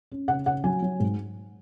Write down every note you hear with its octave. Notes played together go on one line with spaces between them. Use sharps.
C#4
C#3 F#5
C#3 F#5
F#3 G#5
F#3
G#2